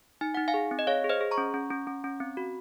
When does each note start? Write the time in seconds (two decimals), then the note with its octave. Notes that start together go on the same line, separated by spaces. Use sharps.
0.21 D#4 G#5
0.35 D#4 F#5
0.48 F5 G#5
0.54 G#4
0.71 C4
0.79 D#5
0.87 G#4 C#5 F5
1.04 G#4
1.09 C5 D#5
1.20 G#4
1.31 A#5 C#6
1.38 C#4
1.54 C#4
1.70 C#4
1.87 C#4
2.04 C#4
2.20 C4
2.37 F#4